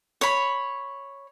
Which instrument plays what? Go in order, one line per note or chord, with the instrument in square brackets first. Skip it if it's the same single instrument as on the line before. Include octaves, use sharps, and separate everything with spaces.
[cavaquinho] C#5 B5